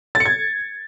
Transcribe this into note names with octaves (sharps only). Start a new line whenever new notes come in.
A6
C#7
G#6